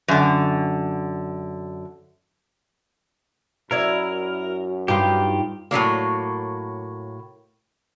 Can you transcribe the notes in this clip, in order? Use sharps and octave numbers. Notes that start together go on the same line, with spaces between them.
F#2 D3
F#2 E4 A#4 C#5 D5
G2 D#4 F4 G4
A2 E3 F#3 A#3